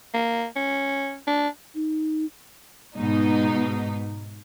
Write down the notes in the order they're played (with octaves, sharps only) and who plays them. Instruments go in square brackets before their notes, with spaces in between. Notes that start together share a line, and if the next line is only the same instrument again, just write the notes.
[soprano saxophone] A#3
C#4
D4
[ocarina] D#4
[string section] G#2 B2 D#4